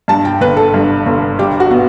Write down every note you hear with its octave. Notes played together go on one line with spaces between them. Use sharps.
G2 A5
G5
G1 B4
A4
G2
G1
G2 G4
F#4
B3